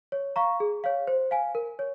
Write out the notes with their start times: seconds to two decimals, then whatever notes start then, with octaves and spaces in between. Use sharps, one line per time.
0.12 C#5
0.36 F5 A#5 C#6
0.60 G#4
0.84 C#5 F5
1.07 C5
1.31 F5 G#5
1.55 A#4
1.79 C#5